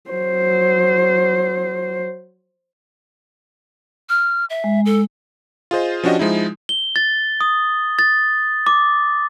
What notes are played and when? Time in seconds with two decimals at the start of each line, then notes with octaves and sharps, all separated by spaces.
0.11 F#3 C5
4.09 F6
4.50 E5
4.64 G#3
4.86 A4
5.71 F4 G#4 C5 D#5
6.03 F3 C#4 D4 F#4 G4 D#5
6.19 F3 G#3 D#4 E4
6.69 G7
6.96 A6
7.41 D#6
7.99 A6
8.67 D6